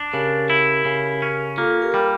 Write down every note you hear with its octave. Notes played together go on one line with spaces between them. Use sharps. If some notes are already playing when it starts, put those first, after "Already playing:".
Already playing: D4
C#3 G4 A#4
E4
C#3
C#4
A#3 F4 A4
G4 A#4
G3